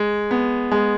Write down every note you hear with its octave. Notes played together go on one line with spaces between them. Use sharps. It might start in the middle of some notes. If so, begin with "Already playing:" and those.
Already playing: G#3
B3
G#3